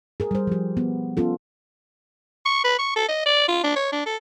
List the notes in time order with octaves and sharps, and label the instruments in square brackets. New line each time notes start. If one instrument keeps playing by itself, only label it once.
[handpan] G#4 A#4
G3 C5
F3 G4
B3
B3 C#4 F4 A4
[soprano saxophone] C#6
B4
C#6
A4
D#5
D5
F4
D4
C#5
D4
A4